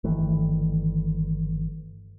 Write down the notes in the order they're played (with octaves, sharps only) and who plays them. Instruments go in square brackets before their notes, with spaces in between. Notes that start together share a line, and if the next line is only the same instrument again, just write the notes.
[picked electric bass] G1 D#3 E3 A3